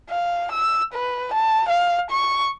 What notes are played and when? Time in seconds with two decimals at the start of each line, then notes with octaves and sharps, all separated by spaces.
0.10 F5
0.52 E6
0.94 B4
1.34 A5
1.69 F5
2.11 C#6